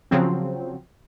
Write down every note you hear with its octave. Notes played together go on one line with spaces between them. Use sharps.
C#3 F3 F#3 C4